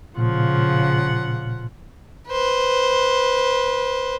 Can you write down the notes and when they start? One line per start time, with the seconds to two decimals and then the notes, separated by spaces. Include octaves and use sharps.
0.17 A#2 C#3 F3 F#5
2.29 B4 C5